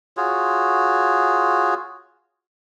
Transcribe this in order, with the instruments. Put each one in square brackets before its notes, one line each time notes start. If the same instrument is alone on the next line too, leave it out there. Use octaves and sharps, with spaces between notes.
[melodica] F4 F#4 G#4 C#5